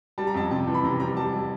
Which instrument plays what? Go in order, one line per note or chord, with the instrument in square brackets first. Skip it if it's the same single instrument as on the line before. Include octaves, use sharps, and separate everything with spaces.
[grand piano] G3 A5
A#5
F2 A5
C3 A5
E3
B5
C3 A#5
G3 A#5
G3 A5
G3